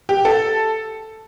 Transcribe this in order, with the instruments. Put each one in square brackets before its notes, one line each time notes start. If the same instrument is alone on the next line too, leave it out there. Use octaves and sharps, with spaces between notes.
[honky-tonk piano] G4
A4